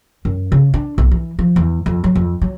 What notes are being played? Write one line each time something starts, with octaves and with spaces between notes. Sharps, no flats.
F#2
C#3
D4
B1
E3
F3
E2
F2
F#3
F2
F#3